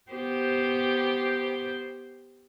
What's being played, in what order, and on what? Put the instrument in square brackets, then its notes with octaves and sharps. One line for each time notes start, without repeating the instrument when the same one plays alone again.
[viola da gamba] B3 G4 C5